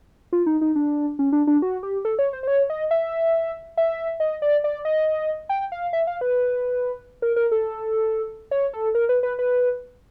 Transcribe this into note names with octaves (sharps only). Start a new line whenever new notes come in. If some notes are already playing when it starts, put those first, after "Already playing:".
F4
D#4
D#4
D4
C#4
D4
D4
F#4
G4
A4
C#5
C5
C5
C#5
D#5
E5
E5
D#5
D5
D5
D#5
G5
F5
E5
F5
B4
A#4
A#4
A4
C#5
A4
A#4
B4
B4
B4